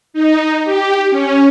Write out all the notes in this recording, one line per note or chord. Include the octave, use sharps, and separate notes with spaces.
D#4
G4
C#4